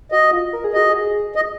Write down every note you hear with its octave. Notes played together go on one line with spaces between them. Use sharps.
F#4 D#5
F4
A#4
G#4
F#4 D#5
G#4
D#5